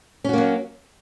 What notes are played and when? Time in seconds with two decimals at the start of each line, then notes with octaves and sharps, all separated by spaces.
0.24 C#4
0.29 F#4
0.33 A#3
0.38 F#3